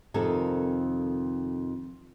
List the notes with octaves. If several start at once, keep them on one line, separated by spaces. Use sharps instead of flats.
F2 C3 D#3 A4 A#4 G#5